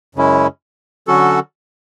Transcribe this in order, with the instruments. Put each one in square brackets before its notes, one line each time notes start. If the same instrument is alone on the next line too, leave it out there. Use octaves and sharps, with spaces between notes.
[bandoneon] F#2 C#3 G#3 C#4 E4
D3 F#3 C#4 F#4 A4